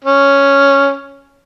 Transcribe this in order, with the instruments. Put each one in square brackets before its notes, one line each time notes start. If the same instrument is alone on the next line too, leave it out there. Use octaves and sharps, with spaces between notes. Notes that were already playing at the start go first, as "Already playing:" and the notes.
[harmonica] C#4